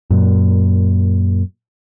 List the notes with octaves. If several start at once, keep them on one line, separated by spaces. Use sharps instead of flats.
F#2 A#2